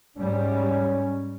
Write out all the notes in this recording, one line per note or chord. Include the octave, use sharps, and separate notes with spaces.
G#2 G3 C#4